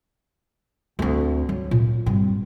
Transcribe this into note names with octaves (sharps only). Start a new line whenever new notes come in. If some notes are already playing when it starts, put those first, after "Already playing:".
D2 C4
F#3
A#2
G2 C4